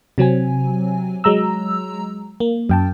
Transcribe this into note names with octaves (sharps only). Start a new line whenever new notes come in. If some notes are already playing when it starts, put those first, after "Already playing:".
C3 F#3 C4 G#5
F#3 G#3 A#5 E6
A#3
F#2 G5 A5